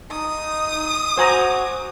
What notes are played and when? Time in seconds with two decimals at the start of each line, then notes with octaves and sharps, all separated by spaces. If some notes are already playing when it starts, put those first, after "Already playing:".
0.11 D#4 D#6
1.18 F#4 C5 G#5 A#5